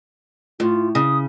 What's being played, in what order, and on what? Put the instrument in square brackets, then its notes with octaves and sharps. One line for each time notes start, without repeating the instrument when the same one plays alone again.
[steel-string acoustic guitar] A2 [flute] F4
[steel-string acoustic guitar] C#3 [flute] D#6